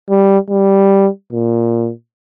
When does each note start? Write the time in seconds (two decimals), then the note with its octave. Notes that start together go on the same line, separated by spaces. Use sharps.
0.09 G3
0.50 G3
1.33 A#2